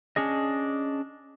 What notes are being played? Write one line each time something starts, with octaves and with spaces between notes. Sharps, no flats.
C#4 D4 G#4 D#5